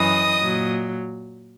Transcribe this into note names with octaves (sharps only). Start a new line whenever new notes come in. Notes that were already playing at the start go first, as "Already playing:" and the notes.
Already playing: F#2 E3 D#5 D#6
A#2 F#3